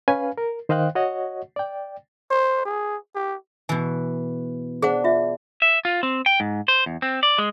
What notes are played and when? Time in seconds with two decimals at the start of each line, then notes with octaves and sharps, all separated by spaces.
0.08 C#4 B4 F5 G#5
0.38 A#4
0.69 D#3 C5 D#5 F5 G5 F#6
0.95 F#4 C#5 D#5 F#5
1.56 D5 G5
2.31 C5
2.65 G#4
3.15 G4
3.69 B2 E3 G#5
4.82 D4 G#4 C5 F#5
5.04 F4 E5
5.62 E5
5.85 F4
6.03 C4
6.26 G5
6.40 G#2
6.68 C5
6.86 E2
7.02 C4
7.23 D5
7.38 G#3